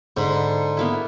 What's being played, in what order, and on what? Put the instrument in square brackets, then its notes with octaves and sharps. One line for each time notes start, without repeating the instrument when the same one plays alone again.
[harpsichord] G#2 [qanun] D3 B5
[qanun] A#3 B3 E4